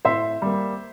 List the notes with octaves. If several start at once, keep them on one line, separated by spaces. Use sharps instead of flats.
A2 C5 E5
G3 A#3